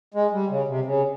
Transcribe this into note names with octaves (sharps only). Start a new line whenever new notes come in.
G#3
G3
C#3
C3
C#3